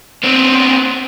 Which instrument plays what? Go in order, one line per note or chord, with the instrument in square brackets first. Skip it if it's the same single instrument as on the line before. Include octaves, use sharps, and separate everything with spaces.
[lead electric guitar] B3 C4